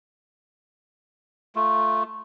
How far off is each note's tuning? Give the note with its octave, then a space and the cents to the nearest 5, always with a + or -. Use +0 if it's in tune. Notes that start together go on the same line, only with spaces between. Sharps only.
A3 +0 F4 -10